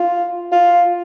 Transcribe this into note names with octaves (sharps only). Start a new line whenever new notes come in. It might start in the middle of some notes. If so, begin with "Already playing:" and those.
Already playing: F4
F4